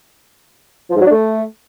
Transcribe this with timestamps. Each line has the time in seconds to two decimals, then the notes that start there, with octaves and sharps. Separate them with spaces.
0.90 F3
0.95 G#2
1.00 F#3
1.06 D4
1.11 A3